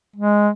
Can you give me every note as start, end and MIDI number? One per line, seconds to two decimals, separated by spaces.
0.16 0.49 56